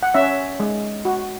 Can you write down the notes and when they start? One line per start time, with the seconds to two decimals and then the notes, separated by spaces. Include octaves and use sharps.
0.03 F#5
0.14 C#4 E5
0.60 G#3
1.05 F#4